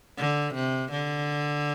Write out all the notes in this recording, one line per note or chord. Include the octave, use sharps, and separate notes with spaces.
D3
C3
D3